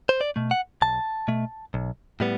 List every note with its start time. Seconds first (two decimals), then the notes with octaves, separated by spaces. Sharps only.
0.09 C5
0.21 D5
0.36 B2 A3
0.51 F#5
0.82 B1 A5
1.28 B2 A3
1.74 B1
2.20 A2 G3 B3